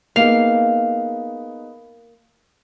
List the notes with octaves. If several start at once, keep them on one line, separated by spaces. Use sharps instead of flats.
A#3 B3 D#4 G#4 F5